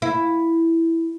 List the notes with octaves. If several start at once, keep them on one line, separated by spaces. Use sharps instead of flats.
E4